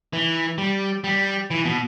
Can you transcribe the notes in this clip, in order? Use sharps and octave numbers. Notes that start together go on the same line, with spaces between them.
E3
G3
G3
E3
B2